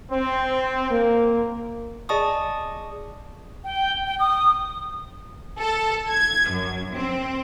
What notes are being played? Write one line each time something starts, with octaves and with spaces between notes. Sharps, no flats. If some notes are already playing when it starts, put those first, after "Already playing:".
C4
A#3
G#4 D5 D#5 A5 C#6 D#6
G5
G5
D#6
A4
G#6
F#2
C4